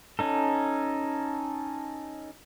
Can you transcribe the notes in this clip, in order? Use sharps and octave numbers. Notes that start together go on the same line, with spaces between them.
C#4 D#4 A4